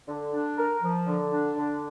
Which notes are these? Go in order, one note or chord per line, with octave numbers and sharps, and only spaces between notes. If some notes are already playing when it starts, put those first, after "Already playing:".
D3
D4
A#4
F3
D3
D4
D3